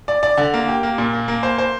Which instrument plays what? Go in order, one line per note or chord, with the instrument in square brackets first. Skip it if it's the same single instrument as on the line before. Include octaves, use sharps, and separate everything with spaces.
[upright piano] D5
D5
D3
A#3
G4
A#3
A#2
A#3
A#3
C5
C5